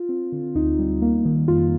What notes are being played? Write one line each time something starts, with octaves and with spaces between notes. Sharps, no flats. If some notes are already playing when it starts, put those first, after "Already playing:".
Already playing: F4
C4
D3
D2 D#4
G3
A#3
D#3
F2 F4